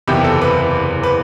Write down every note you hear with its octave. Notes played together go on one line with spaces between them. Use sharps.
F#1 E2 C3 G4
A4
B4
B4